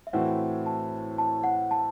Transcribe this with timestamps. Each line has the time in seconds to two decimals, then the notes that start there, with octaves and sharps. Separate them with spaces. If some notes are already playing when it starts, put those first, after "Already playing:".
0.07 E5
0.13 A2 E3 A3 C4 F#4 F#5
0.66 A5
1.18 A5
1.44 F#5
1.71 A5